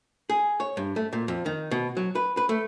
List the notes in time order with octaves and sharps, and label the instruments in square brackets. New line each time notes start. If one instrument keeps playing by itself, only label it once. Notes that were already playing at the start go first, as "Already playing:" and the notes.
[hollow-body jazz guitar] G#4
C#5
G2
A3
A#2
F2
D#3
B2
F#3
B4
B4
A3